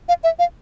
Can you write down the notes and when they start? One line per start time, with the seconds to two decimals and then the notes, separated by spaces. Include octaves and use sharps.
0.09 F5
0.24 E5
0.39 F5